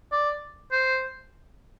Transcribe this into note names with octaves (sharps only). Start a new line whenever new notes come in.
D5
C5